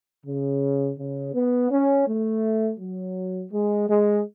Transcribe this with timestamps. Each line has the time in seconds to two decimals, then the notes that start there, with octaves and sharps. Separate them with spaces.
0.26 C#3
0.99 C#3
1.35 B3
1.71 C#4
2.08 A3
2.80 F#3
3.52 G#3
3.89 G#3